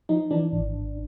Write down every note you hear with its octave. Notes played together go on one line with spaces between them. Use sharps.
F3 D#4
E3 D4
G#1
G#1